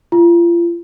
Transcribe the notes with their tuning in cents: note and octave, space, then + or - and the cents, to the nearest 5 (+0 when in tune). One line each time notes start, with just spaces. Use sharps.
F4 -35